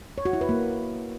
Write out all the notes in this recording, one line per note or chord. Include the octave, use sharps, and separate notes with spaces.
C#5
F#4
E4
B4
A#3